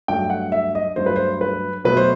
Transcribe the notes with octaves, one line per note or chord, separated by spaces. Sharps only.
G2 F#3 A3 G5
F#5
E5
D#5
G2 F#3 A3 C5
B4
C5
B4
B2 F#3 A3 B4
C5